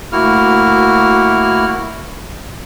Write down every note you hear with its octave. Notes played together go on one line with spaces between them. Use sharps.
D2 A#3 E4 F#4 F6